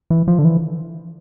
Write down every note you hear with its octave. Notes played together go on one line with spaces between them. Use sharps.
E3
F3
D3
E3